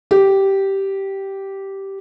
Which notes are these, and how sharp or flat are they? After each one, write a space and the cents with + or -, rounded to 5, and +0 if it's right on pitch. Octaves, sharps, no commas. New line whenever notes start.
G4 -10